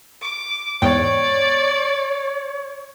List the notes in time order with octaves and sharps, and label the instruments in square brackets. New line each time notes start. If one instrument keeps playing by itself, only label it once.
[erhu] D6
[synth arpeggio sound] E2 G#2 G5 [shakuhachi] C#5 [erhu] D5